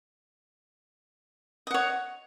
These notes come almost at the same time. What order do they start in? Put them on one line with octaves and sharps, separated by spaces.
D#5 F#5 C#5